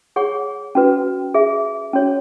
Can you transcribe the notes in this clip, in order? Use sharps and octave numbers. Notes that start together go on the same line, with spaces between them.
G#4 C#5 F#5 C#6
C#4 F#4 B4
G#4 E5 C#6
C#4 F#4 C#5